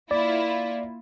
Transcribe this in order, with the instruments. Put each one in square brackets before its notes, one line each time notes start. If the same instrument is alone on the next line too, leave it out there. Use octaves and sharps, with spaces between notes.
[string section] A#3 E4 F4 [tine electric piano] D5